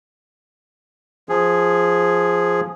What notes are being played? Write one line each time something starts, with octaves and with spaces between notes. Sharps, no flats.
F3 G#4